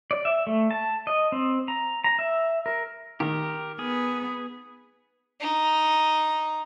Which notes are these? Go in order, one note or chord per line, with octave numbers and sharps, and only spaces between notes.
D5
E5
A3
A5
D#5
C4
A#5
A#5
E5
A#4
D#3 G4 A#4
B3 G#4
D#4